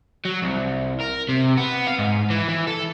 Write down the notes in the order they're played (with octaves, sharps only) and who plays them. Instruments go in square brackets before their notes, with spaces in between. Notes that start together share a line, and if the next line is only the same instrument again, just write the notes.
[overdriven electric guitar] F#3
C2
A#4
C3
B3
F5
G#2
E3
E3
A4